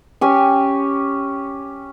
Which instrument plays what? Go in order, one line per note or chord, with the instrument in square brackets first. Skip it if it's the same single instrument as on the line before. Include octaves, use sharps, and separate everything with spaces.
[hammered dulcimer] C#4 G4 G#5